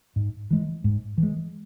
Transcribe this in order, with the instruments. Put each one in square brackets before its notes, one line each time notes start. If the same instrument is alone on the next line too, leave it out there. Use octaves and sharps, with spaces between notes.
[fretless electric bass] G#2
E3 G#3
G#2
E3
G#3